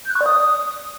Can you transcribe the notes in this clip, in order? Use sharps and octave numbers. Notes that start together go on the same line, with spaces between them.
G6
F#6
C#6
D5
D#6